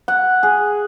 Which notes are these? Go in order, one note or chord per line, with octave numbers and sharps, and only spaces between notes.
F#5
G#4